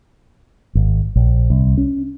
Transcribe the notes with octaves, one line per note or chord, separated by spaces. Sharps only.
G#1
A#1
C2
C#4